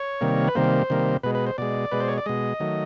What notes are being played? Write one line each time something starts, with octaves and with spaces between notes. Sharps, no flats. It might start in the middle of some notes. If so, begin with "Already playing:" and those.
Already playing: C#5
C3 D#3 G3 A#3
B4
C3 D#3 G3 A#3 C5
C3 D#3 G3 A#3
B2 G#3 B4
B4
C5
B2 G#3 D5
B2 G#3 B4
C5
C#5
D5
B2 G#3 D#5
D#3 F#3 A3